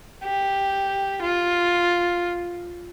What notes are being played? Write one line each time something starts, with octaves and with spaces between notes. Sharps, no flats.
G4
F4